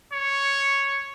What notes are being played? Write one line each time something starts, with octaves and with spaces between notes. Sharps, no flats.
C#5